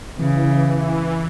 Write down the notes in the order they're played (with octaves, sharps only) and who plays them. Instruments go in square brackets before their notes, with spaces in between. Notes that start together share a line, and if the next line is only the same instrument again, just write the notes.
[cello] C#3 [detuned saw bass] E3